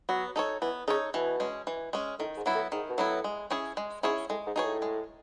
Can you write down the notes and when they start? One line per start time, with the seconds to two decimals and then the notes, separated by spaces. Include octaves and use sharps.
0.09 F#3 B3
0.36 D#4 A4 C#5
0.62 E3 B3
0.87 C#3 D#4 A4 C#5
1.14 B2 E3
1.40 G#3 C#4
1.67 E3
1.93 G#3 C#4
2.19 A2 D#3
2.37 G#2
2.46 F#3 B3 E4
2.55 A2
2.72 G#2 D#3
2.90 B2
2.98 A2 F#3 B3 E4
3.24 G#3
3.50 C#4 E4 G#4 C#5
3.77 G#3
4.03 G#2 C#4 E4 G#4 C#5
4.30 A2 G#3
4.47 G#2
4.56 B2 D#4 G#4 C#5
4.64 A2
4.82 G#3